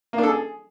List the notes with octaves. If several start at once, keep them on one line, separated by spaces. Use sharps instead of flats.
A#3
D4
A4
G#4